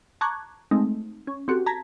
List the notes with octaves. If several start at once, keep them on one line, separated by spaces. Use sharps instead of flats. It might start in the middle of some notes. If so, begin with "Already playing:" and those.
A5 A#5 C#6 D6 F#6 G#6
G#3 A3 C4 D#4
C#4
C4 F#4 G4 A4
A5 A#5 G#6 A#6 B6